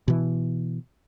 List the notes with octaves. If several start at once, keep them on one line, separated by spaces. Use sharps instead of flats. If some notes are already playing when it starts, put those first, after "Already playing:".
B2 E3